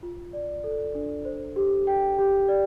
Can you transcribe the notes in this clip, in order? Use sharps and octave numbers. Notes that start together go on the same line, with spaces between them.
F4
D5
A4
D4
C5
G4
G5
G4
D5